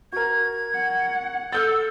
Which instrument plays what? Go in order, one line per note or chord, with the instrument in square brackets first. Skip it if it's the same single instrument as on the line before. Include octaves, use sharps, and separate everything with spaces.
[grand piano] F#4 A#4 [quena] G#6
[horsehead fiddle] F#5
[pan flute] A4 [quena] E6 [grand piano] F6 G6 A6